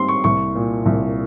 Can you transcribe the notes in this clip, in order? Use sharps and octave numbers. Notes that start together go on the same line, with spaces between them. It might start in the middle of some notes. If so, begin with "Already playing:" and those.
Already playing: G#2 G3 C4 C6
C#6
C2 C#6
A#2
C2